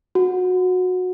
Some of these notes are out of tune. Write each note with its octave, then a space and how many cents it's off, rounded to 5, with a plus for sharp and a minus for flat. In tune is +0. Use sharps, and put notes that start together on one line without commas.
F#4 -20